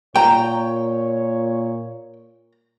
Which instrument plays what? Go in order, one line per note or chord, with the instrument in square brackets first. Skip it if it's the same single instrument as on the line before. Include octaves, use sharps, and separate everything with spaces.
[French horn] A#2 [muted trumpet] C#5 [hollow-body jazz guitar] G5 [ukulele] A#5